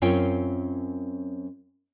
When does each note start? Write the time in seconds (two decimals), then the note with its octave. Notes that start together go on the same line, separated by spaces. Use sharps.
0.02 F#2 C4 C#4 F4 C#5 G5